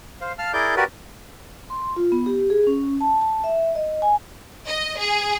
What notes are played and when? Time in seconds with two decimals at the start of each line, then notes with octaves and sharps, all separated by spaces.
0.21 C5 F5
0.38 F5 A5 F6
0.53 E4 G#4 A#4 D5 D6 G6
0.77 F#4 G4 A#4 B4 D5
1.70 C6
1.96 F4
2.12 B3
2.26 G4
2.50 G#4
2.67 C#4
3.01 A5
3.21 A5
3.44 E5
3.75 D#5
4.02 G#5
4.66 D#5
4.98 G#4